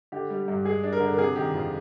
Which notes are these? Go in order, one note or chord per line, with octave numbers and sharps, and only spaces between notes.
D3 G4
G3
G2
G#3 G#4
D4
A#4
D3
A#4
C3 G#4
D#3 G4
F2 F4